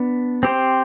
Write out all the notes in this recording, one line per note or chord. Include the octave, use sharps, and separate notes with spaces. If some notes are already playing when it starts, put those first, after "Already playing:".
Already playing: B3 D4
C4 G4 C5